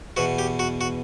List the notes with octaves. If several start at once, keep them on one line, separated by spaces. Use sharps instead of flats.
E2 B2 F#4
G4
F#4
F#4